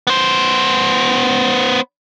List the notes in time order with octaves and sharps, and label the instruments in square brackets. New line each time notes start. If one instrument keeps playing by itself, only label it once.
[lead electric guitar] B3 C5